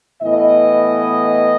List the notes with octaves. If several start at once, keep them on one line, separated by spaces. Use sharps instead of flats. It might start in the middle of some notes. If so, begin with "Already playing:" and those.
A2 E3 B3 D#5